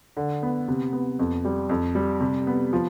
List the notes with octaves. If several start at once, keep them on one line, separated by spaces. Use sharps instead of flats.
D3
B3
C3
B3
F2
G3
F2
G3
C3
B3
F3